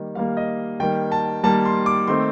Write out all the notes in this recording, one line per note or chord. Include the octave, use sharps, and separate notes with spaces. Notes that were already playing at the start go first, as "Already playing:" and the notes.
Already playing: D#3 G3 A#3
D#3 G3 A#3 F5
D#5
D#3 G3 A#3 G5
A5
D#3 G3 A#3 A5
C6
D6
D#3 A3 C4 C6